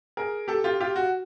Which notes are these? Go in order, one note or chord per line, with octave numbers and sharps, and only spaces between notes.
G#4 A#4
G4 A4
F4 G4
F4 G4
F#4